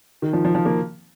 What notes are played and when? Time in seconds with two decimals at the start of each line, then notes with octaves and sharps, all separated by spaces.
0.22 D#3
0.33 F3
0.45 F3
0.55 F3
0.65 A#3